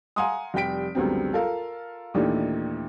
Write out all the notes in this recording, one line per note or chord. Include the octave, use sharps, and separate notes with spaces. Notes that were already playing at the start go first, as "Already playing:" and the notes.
F5 F#5 G#5 A#5 C6 D#6
F1 G3 G4 G5 B6 D7
C#2 F#2 D3 G3 B3 C4
F4 A4 A#4 F5
D#2 A#2 D#3 E3 A3 D4